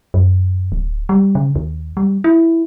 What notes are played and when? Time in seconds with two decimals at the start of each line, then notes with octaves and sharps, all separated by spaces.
0.14 F#2
0.72 D1
1.09 G3
1.35 C#3
1.56 D#2
1.97 G3
2.24 E4